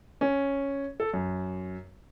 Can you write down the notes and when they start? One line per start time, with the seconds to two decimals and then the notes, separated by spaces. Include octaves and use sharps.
0.21 C#4
1.00 A4
1.14 F#2